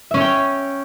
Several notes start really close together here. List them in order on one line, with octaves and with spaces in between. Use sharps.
E5 C#4 C#5 G5